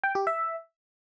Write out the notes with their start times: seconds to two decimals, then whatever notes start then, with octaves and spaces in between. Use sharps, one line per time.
0.04 G5
0.15 G4
0.27 E5